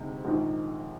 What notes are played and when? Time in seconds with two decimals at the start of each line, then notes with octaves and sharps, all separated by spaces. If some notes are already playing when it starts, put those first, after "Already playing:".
Already playing: D2 C3 G#3 D#4
0.25 A#1 G#2 D#3